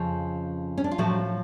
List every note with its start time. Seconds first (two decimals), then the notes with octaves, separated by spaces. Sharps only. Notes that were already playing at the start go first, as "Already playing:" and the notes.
Already playing: F2 C#3 F3
0.78 C#4
0.84 D4
0.91 F4
0.98 A2 F3 F#3 F#4